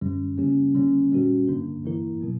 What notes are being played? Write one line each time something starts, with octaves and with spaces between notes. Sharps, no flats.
F#2 D3 G3 C#4
C#3 G3 A#3 C#4 G4
D3 G3 A#3 C#4
A#2 G3 C#4 F#4 A#4
G2 D3 A#3 D4 A#4
G2 E3 A#3 E4 A#4
B2 F#3 B3